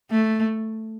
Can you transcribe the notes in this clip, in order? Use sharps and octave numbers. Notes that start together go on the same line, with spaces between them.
A3